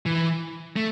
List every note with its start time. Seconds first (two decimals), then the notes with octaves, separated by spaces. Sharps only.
0.06 E3
0.76 A3